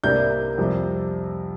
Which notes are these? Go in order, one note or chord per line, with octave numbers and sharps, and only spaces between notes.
C2 C3 G3 A#3 D4 G6
F2 C3 G3